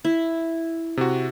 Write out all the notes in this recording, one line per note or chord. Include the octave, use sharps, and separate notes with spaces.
E4
C3 F#4